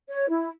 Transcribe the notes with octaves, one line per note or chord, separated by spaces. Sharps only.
C#5
E4